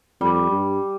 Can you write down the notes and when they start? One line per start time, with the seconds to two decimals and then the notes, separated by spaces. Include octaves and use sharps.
0.21 F2 G3
0.51 G2